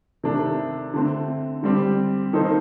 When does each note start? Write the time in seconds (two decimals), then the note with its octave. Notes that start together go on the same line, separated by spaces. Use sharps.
0.24 C3 D#3 A3 D4
0.94 D3 A3 C4
1.63 D3 G3 C4 G4
2.33 D#3 A#3 D#4 A4 C5